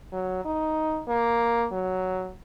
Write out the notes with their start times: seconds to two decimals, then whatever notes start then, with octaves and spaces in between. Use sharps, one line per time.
0.12 F#3
0.45 D#4
1.08 A#3
1.72 F#3